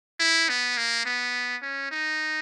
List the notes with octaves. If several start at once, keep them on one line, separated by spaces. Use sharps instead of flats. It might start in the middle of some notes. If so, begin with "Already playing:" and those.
E4
B3
A#3
B3
C#4
D#4